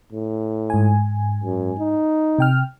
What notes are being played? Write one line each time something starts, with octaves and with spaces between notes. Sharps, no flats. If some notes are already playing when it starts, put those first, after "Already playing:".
A2
G#2 G#5
F#2
D#4
C3 G5 F6